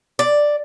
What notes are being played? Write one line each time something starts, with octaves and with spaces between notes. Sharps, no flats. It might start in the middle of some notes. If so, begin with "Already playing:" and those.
D5